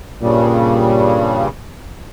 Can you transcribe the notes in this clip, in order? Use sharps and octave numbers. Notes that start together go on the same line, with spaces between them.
G2 A#2 C#3 G3